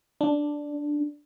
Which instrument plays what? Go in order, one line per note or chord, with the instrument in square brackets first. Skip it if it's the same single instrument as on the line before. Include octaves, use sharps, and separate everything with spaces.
[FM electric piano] D4